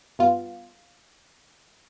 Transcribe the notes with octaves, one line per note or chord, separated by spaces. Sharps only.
G2 B3 F4